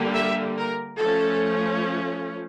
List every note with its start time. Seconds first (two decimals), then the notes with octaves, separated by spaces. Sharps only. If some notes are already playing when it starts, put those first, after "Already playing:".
Already playing: D3 G3 A#3
0.14 E5
0.57 A#4
1.00 F3 A3 C#4 A4